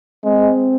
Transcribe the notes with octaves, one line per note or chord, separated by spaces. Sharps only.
G#3 C4